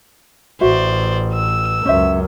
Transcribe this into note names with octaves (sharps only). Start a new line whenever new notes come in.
A1 F#4 C5 D5 E5
E6
C#2 F#2 C#4 C5 E5